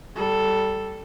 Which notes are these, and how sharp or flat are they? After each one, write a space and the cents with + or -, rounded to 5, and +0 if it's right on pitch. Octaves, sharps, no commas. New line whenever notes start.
G3 -15 A4 +0